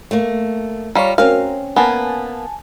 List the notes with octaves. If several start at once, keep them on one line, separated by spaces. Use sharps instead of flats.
A3 A#3
G3 F4 C#5 F5 A#5
C4 C#4 F#4 A#4 F5
A#3 B3 G#5 A5